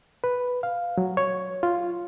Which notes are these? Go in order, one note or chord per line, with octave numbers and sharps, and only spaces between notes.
B4
F5
F#3
C#5
F4